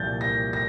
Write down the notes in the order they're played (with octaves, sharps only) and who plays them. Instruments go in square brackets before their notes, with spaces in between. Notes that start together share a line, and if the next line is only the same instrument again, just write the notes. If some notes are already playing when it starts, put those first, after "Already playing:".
Already playing: [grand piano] C2 A#2 F3 G6 A6
A#6
A#6